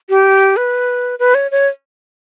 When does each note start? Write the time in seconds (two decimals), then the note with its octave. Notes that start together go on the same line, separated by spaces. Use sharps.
0.09 G4
0.57 B4
1.19 B4
1.34 C#5
1.51 C#5